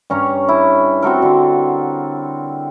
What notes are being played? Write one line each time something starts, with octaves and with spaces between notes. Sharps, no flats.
G2 C#4 A#4 C#5
E4
C4 F#4 A4 A#4
D3 C5